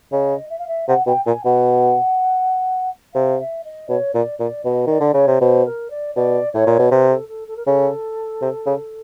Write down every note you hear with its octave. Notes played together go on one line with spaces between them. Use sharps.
C#3 D#5
E5
F5
E5
C3 F#5
B2 G5
A#2 G#5
B2 F#5
C3 F5
E5
D#5
B2 C#5
A#2 D5
A#2 D5
B2 D#5
D#3 D5
D3
C#3 C#5
C3
B2 C5
A#4
D5
B2 D5
A2 C#5
A#2
B2
C3 B4
A4
A4
A4
A#4
C#3 A4
C3
C#3